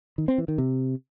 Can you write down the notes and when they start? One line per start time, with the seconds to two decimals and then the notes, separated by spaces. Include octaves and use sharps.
0.18 D#3
0.28 C4
0.38 E3
0.48 D#3
0.58 C3